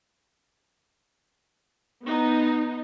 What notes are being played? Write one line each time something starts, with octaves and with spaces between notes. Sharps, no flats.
B3 D#4